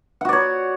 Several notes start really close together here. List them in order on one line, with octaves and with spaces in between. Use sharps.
F#5 F#4 D5 C#5